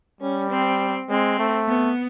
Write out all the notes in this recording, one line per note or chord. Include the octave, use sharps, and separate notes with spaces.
G3 C#4
C4
G#3 C4
A3
B3